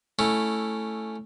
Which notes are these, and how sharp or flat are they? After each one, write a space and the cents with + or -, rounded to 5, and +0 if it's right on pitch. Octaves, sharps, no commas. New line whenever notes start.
A3 +0 C#4 +0 E4 +0